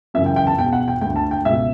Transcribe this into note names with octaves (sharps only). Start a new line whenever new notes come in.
F#2 C#3 E3 E5
G5
G5
A5
E2 B2 G5
F#5
G5
D2 D3 G5
A5
G5
C#2 B2 E5